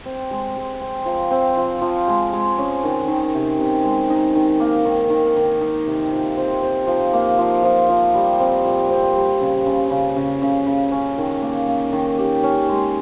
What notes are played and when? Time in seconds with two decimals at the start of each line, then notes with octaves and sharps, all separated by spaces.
0.06 C4
0.31 G#3
0.56 G#3
0.81 C4
1.06 F3
1.31 C4
1.57 F3
1.82 F3
2.08 G#3
2.33 G#3
2.58 C#4
2.84 D#3
3.08 D#3
3.34 C3
3.58 C3
3.84 G#3
4.10 D#4
4.35 D#3
4.60 A#3
4.85 D#3
5.10 D#3
5.37 D#3
5.61 D#4
5.86 C3
6.12 F3
6.37 C4
6.63 C4
6.87 F3
7.13 A#3
7.39 F3
7.64 F3
7.89 F3
8.15 G3
8.40 C4
8.65 A#2
8.90 C4
9.16 G3
9.40 C#3
9.66 C#3
9.90 C#3
10.16 C#3
10.42 C#3
10.66 C#3
10.92 C#4
11.18 D#3
11.42 A#3
11.67 A#3
11.93 D#3
12.18 G4
12.44 C#4
12.69 G#3